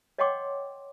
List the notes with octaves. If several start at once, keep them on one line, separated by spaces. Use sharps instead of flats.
C#5 D#5 F#5 G5 C6 D6